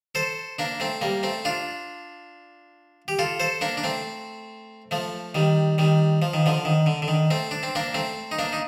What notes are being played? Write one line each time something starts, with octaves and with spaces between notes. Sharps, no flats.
A4 C5
A#3 D4
A3 C4
G3 A#3
A3 C4
D4 F4
G4
F4 A4
A4 C5
A#3 D4
D4
A3 C4
F3 A3
D#3 G3
D#3 G3
F3
D#3
D3 F3
D#3
D3
D3
D#3
A3 C4
D4
C4
A#3 D4
A3 C4
D#4
A#3 D4
D#4